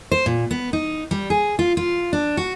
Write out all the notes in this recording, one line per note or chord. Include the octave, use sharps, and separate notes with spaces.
C5
A#2
B3
D#4
G3
G#4
F4
F4
D4
F#4